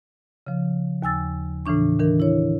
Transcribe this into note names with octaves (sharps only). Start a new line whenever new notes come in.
C#3 F3
D#2 G#5 E6 A6
A2 C#3 E3 D4 C#6
D#3 E3 D4 A#4
E4 C#5